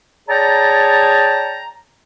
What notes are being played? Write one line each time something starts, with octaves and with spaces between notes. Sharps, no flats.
G#4 C#5 D5 G5 A5 A#5